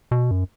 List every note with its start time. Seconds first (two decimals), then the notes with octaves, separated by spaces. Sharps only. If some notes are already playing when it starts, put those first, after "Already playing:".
0.11 B2
0.31 F#2